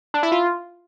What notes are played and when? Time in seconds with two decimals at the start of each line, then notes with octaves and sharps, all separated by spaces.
0.14 D4
0.23 E4
0.32 F4